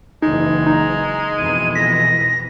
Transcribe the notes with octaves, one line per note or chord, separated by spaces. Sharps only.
F#1 E3 G#3 D#4
D#4 A#5
F2 B2 E3 D#7
A#6 B6